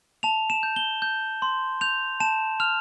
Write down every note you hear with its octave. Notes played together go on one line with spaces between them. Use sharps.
A5 F7
E7
G6
G7
G6
C6
G6 F7
A5 E7
F6 F7